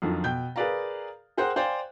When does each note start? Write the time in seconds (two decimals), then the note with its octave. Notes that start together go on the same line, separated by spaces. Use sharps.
0.02 F2 D3 D#3 F3 F#3
0.24 B2 G5 G6
0.56 G#4 A#4 B4 D5 F5 A#5
1.37 G#4 A#4 C5 F#5 G5 F#6
1.56 C5 D5 F5 G5 G#5